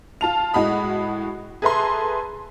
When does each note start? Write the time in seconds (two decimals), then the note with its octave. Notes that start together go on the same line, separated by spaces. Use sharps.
0.21 F4 A5 F7
0.54 A2 G#3 F#4 B5 D#6
1.62 G#4 A4 B4 E5 A#5 C6